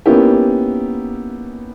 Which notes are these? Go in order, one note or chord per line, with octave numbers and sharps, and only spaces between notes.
A#3 B3 C#4 D#4 E4 G4